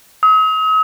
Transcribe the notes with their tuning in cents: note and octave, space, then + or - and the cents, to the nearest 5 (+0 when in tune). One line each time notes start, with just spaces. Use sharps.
D#6 +45